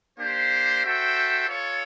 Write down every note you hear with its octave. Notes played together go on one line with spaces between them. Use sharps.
A#3 D4 G4 C5
F#4 A4 C5 E5 G5
F4 A4 C#5